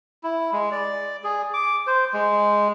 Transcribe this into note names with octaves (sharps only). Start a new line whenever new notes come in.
E4
G#3
D5
G#4
D6
C5
G#3